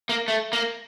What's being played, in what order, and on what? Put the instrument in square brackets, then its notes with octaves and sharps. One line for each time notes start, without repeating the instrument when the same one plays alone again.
[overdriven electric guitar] A#3
A3
A#3